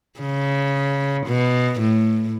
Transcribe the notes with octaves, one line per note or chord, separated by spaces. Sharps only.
C#3
B2
A2